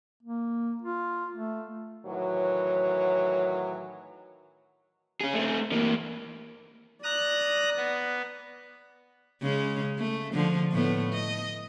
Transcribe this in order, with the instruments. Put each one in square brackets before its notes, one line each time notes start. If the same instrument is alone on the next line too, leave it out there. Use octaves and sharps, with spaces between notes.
[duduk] A#3
F4
A3
[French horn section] A2 D#3 E3 F#3
[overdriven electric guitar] C#4 G#4
A3 C4
E3 A#3
[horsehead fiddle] D5 [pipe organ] A#5 D#6 F#6
[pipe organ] B3
[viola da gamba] C#3 G#3 C#4
A3
D3 F3
A2 A3 B3
D#5